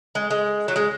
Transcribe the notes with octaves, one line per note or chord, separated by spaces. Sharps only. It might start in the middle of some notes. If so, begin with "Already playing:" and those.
G#3
G#3
F#3
G#3